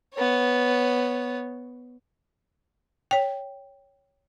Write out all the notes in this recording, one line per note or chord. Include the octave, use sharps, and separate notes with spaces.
B3 C#5
C#5 G5